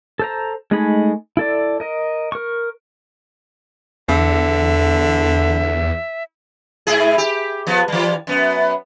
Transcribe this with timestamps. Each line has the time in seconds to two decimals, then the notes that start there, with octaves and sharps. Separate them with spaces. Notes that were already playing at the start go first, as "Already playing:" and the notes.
0.19 A4 C5 A#5
0.71 G#3 A3 D#4 G#4 B5
1.37 E4 A4 D5
1.80 A#4 D#5
2.32 A#4 C#6
4.08 E2 D3 E5
6.87 G#2 E4 G#4
7.18 G4
7.67 F3 B3
7.88 E3 G3
8.27 F#2 B3